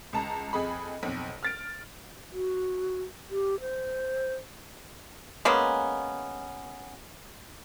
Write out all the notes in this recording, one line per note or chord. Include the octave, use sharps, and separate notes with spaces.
C#2 A5 A#5
F2 G#4 D#5 B5
B1 F2
F6 A6 D7
F#4
G4
C5
G#3 A#3 B3 C#4